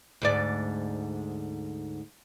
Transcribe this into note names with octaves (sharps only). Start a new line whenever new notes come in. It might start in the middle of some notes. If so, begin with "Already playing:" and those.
D2 G#2 D5